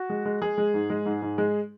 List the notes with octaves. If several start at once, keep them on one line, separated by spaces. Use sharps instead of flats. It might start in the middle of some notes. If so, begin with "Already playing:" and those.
Already playing: F#4
G#3
G#3
G#3 G#4
G#3
G#2
G#3
G#2
G#2
G#3